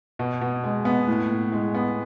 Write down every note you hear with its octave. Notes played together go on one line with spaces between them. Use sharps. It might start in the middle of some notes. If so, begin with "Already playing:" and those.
B2
B2
G#3
B3
A2
A2
G#3
B3